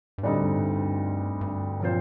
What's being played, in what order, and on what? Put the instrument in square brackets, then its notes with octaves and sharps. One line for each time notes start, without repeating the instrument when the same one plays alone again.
[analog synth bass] G2
[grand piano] D2 D3 G3 C4 D#4 [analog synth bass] A2
[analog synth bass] G2
G2
[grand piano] A#2 F3 C4 F4 C5